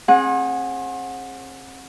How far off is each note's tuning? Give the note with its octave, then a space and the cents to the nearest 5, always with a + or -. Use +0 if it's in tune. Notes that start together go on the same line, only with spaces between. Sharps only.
C4 +40 G#4 +0 F#5 -25